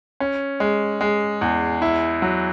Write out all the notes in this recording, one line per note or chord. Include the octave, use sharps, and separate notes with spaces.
C#4
G#3
G#3
E2
E4
F#3